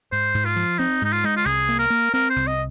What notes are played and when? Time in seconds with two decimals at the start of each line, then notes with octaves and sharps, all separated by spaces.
0.12 G#2 C5
0.34 G#2
0.45 F4
0.56 F3
0.79 C4 D#4
1.02 G#2 D#4
1.12 F4
1.24 G#3 D#4
1.36 F4
1.45 C2 G#4
1.69 A#3
1.79 A#4
1.90 A#3
2.14 C4 A#4
2.30 C5
2.36 C2
2.47 D#5